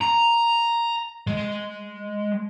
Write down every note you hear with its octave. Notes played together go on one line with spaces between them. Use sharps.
A#5
G#3